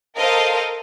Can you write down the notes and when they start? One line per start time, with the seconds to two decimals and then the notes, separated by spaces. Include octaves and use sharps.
0.17 A4 A#4 C5 D#5 F5